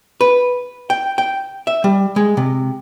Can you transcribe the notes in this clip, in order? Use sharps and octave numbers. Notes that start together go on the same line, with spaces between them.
B4
G5
G5
E5
G3
G#3
C3